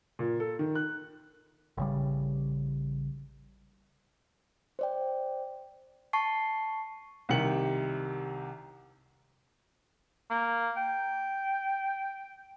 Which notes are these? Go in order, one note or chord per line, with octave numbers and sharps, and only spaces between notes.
A#2
A4
D#3
F#6
A1 C#3 G3
C5 D5 G5
A5 C#6 C7
C2 C3 D#3 G4 C#7 F#7
A#3
G5